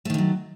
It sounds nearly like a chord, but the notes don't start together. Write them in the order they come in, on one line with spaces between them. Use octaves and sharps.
A3 D#3 D3 F#3